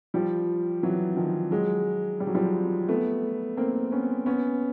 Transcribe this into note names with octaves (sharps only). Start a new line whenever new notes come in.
F3 G3
E3 F#3
D#3 F3
F#3 G#3
G3
F#3
F3 G3
A3 B3
A#3 C4
B3 C#4
B3 C#4